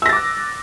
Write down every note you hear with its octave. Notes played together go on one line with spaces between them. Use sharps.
D6 E6 F#6 A6 A#6